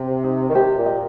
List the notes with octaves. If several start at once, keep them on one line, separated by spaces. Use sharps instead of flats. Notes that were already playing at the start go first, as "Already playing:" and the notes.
Already playing: C3
D#4
D#3
C3 G4
A#2
D#5